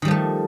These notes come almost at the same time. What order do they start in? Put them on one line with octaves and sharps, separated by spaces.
D#3 G3 F3 A3